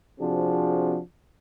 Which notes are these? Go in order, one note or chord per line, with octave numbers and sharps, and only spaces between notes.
C3 F3 C4 D4 F#4 G#4